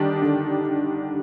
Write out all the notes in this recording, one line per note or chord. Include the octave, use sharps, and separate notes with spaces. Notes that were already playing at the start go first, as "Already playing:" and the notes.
Already playing: D3 D#3 G3 D4 G4
D3